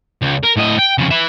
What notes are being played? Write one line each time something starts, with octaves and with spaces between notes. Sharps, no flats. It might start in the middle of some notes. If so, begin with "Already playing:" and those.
C#2
A#4
A2 D#5
G5
F2 C#3
B4 E5